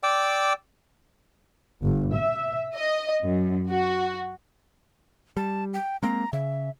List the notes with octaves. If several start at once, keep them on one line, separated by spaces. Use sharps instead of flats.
D5 G5 D6 E6
G1
E5
D#5
F#2
F#4
G3 A5
G5
G#3 A#3 C4 A#5
C#3 E5